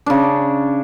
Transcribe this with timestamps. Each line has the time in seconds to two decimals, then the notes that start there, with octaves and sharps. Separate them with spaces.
0.06 C#3 D4